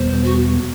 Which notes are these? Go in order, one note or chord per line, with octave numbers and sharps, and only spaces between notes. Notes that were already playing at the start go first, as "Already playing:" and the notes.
Already playing: E2 B2 G3 B3 C5
F#4